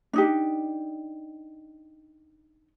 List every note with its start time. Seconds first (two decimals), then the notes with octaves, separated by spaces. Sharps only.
0.13 D4 D#4 G4